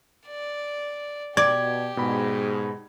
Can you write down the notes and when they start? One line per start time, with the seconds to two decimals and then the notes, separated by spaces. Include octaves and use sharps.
0.28 D5
1.37 B2 G4 D5 G#6
1.97 G#2 B2 B5